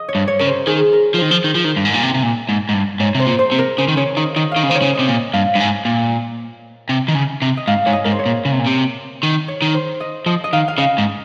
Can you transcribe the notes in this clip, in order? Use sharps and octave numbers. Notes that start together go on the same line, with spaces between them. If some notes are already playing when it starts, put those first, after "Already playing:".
Already playing: D#5
C#5
G2
C#5
C#3 A#4
C5
D#3 G#4
A#4
F3
D#3 C5
F3
D#3
F3
D#3
G2
G#2
A#2
C3
C3
A#2
G#2
G#2
G2
G#2 C#5
C3 C5
A#2
C5
C3
A#4
C#3 C5
D#3
C#3 C#5
D#3 D#5
D#3 D#5
D#3 D#5 F5
C#3
D#3 C5
C#5
C#3
C3 D#5
A#2
D#5
G2 F5
G2
G#2
A#2
C3
D#3
C#3
C3
D#5
G#2 F5
G#2 C#5
D#5
G#2 A#4
C5
C#5
A#2
C#3
C3
A#2
C3
D#3
C#5
D#3
C5
D#5
F3 D#5
D#5
D#3 F5
F5
C#3 D#5
G#2